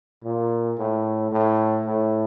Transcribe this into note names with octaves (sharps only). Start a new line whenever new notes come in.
A#2
A2
A2
A2